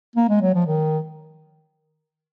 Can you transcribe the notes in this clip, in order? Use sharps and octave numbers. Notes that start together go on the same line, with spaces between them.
A#3
G#3
F#3
F3
D#3